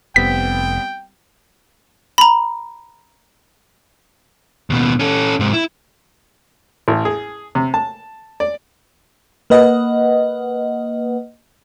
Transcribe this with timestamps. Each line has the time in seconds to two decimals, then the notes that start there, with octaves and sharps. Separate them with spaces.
0.16 F1 G3 B3 C4 G5 B6
2.18 A#5 B5
4.70 D#2 B2
5.00 C#4 A4
5.40 G#2 C3
5.53 E4
6.88 A1
7.05 G#4
7.55 C3
7.74 A5
8.40 D5
9.50 A#3 B4 D#5 F#5